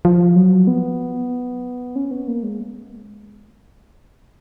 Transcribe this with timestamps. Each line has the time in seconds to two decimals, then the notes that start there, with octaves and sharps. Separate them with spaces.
0.05 F3
0.36 F#3
0.67 B3
1.96 C#4
2.11 B3
2.28 A#3
2.43 G#3